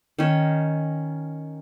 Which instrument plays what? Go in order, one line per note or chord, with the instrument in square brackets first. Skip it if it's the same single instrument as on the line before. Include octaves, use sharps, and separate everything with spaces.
[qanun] D#3 C#4